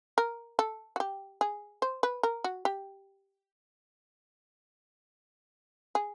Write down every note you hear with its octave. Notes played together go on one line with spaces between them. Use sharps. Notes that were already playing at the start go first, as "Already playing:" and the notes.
A#4
A4
F#4
G4
G#4
C5
B4
A#4
F#4
G4
G#4